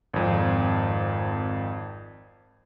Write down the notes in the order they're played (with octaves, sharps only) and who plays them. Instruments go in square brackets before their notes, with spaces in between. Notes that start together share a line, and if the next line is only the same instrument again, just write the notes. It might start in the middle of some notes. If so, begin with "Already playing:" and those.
[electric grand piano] G#1 F2